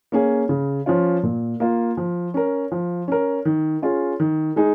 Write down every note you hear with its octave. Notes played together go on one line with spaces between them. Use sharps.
A#3 C#4 G#4
C#3
F3 C#4 F4
A#2
A#3 F4
F3
C#4 A#4
F3
C#4 A#4
D#3
C#4 F4 G#4
D#3
G#3 D#4 G#4